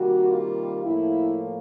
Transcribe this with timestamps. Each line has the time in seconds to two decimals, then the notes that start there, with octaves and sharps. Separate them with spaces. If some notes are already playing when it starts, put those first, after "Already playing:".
Already playing: C3 D#3 G3 A#3 F#4
0.31 F4
0.84 A2 F3 A#3 E4